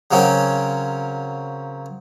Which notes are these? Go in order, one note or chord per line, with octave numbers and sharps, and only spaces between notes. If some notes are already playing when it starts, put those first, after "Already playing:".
C#3 F#3 A#3 C4 C#4